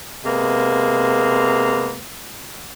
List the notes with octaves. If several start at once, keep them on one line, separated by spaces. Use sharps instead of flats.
C3 G#3 A#3 B3